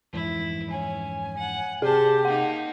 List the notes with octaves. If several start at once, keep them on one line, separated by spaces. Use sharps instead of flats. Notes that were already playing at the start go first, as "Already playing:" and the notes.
F2 G#2 E3 E4
C#4 G#5
F#5
C3 G4 G#4 C5 A5
A#3 D#4 F#5